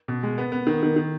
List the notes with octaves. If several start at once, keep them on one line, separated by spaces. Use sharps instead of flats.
B2
G#3
B3
B3
D#3
D#3
D#3